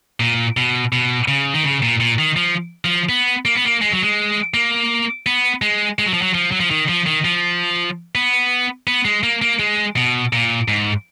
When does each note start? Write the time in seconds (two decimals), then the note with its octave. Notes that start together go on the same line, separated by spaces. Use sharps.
0.20 A#2
0.57 B2
0.92 B2
1.28 C#3
1.54 D#3
1.64 C#3
1.82 A#2
2.00 A#2
2.18 D#3
2.37 F3
2.85 F3
3.09 B3
3.45 A#3
3.55 B3
3.65 A#3
3.81 G#3
3.92 F#3
4.02 G#3
4.54 A#3
5.26 B3
5.62 G#3
5.99 G#3
6.06 F#3
6.14 F3
6.22 F#3
6.34 F3
6.51 F#3
6.60 F3
6.71 D#3
6.89 F3
7.06 D#3
7.25 F3
8.15 B3
8.87 B3
9.05 G#3
9.23 A#3
9.42 A#3
9.59 G#3
9.96 B2
10.33 A#2
10.68 G#2